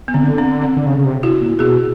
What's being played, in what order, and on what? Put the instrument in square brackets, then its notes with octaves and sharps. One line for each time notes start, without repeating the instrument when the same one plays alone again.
[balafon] B3
[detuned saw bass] D3 [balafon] C4
[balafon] C4
C4
[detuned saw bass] D3
C#3
C#3
C3
[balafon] E4 F#4
[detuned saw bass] A#2
[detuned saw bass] B2 [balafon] F#4 G#4